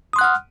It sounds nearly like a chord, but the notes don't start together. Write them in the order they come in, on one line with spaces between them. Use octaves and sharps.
D#6 C6 F#6 F#5 F6